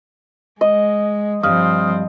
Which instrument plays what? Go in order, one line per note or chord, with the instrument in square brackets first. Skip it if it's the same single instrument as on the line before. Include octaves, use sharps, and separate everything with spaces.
[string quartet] G#3 [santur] D#5
[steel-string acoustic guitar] G2 [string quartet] F3 C4 [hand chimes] D#6 F6